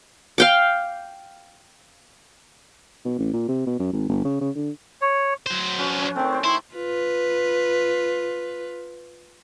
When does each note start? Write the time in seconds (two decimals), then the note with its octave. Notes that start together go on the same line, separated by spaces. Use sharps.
0.38 F5 G5 D6
3.05 B2
3.19 A1
3.33 A#2
3.48 C3
3.67 B2
3.79 F#2
3.93 G#1
4.09 G1
4.25 C#3
4.41 C#3
4.56 D3
5.01 C#5
5.46 F#3 C5
5.78 C#4 F#4 B4
6.01 C#4
6.16 D#3 A3 C4
6.32 C5 G5
6.44 E4 C6
6.74 F4 B4